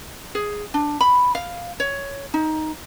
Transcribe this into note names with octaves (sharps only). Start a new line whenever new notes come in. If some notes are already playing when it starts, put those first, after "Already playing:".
G#4
D4
B5
F5
C#5
D#4